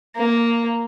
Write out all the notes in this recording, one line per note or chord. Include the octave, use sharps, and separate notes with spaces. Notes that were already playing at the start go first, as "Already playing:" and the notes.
A#3